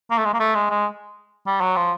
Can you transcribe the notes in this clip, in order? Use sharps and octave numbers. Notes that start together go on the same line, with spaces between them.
A#3
A3
G#3
A#3
A3
G#3
G#3
G3
F#3
F3